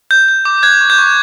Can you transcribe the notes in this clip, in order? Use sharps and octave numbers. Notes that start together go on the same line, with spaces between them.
G6
G6
D6
F#6 G#6
C#6
G6
C#6